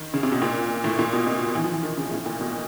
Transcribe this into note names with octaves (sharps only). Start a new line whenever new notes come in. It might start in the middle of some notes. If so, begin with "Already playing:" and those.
Already playing: D#3
C#3
C3
B2
A#2
A2
A#2
B2
C3
E3
F3
E3
D#3
C#3
A2
A#2
B2